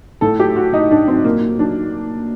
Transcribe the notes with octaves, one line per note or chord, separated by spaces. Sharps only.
A2 A4
F#3 G4
F#3 F#4
A2 D#4
A2 D4
F#3 C4
A#2 A#3
F#3
F#3 D4